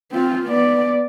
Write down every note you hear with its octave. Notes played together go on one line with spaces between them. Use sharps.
C4 F4
B3 D5